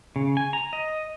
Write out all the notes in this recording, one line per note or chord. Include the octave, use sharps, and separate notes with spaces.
C#3
G#5
A#5
D#5